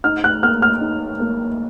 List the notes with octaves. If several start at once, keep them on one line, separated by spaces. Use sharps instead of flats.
D#4 F6
F#6
A#3 F6
F6
D#4
A#3